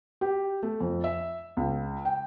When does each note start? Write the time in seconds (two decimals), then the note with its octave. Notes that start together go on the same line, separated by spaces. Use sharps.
0.21 G4
0.63 A3
0.81 F2
1.04 E5
1.57 C#2
2.05 G5